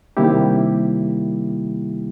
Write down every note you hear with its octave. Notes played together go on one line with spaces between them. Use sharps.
C3 D#3 G3 A#3 E4 G4